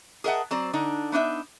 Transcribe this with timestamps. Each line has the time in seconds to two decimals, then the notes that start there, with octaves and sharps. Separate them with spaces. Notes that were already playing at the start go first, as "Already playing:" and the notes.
0.24 G#4 A#4 D#5 E5 F#5 A5
0.51 F#3 C4 C5 D5
0.73 D3 D4 D#4
1.12 B3 D4 D#4 E5